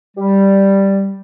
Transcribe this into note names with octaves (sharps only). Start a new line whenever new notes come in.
G3